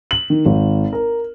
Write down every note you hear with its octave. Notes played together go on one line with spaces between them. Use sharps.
F#7
D#3
G#1
A#4